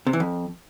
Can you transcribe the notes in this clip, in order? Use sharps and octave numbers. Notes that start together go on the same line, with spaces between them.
C3
E3
F2